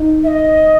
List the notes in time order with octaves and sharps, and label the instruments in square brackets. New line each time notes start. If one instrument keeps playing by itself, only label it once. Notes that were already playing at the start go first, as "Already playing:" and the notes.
Already playing: [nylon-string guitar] D#4
[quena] E5
D#5